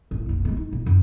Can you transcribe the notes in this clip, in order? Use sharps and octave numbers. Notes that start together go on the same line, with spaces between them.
A1
F1 A#1
B2 G#3
D#4
A#2
F#2